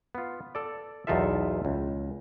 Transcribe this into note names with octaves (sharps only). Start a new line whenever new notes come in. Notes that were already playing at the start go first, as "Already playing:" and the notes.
B3 F4
A4 D5
B1 E2 D#4 F4 A4 E5
C#2